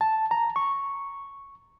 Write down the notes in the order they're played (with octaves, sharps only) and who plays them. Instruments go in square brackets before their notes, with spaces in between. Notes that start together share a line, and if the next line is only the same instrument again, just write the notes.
[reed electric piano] A5
A#5
C#6